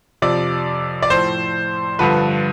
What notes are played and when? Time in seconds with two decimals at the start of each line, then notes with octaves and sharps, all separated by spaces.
0.22 F2 C3 F3 D5
1.02 D5
1.10 A2 F3 C5
1.99 G2 D3 F3 B4